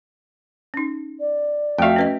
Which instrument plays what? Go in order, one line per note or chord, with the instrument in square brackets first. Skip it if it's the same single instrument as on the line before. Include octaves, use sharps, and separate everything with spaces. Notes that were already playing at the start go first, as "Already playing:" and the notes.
[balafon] C#4 D#4
[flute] D5
[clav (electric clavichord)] F2 F5 [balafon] A3 F#4 [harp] E5 G5
[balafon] C#4 B4 D#5